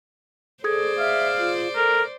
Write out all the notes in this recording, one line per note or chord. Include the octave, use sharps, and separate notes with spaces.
G#4 A4 C5 D5 D#6 G#6
E5 F5
F4
A4 A#4